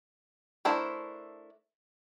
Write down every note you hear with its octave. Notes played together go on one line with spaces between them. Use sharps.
A3 D4 E4 A#4 C5